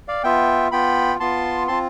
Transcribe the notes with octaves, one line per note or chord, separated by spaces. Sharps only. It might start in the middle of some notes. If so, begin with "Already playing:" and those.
D5 F5
B3 F4 E5 G5
B3 F4 G5 B5
B3 F4 A5 C6
C4 F4 A5 C6